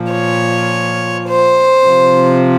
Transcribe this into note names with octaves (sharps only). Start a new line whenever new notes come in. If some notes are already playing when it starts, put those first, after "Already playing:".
Already playing: A#2 F3
C#5
C5
C3 F3